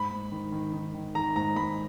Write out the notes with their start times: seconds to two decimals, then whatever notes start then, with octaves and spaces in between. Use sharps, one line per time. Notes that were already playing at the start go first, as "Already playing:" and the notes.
Already playing: G#2 B5
0.11 G#2
0.32 D#3
0.52 D#3
0.73 D#3
0.94 D#3
1.15 D#3 A#5
1.36 G#2 A#5
1.56 G#2 B5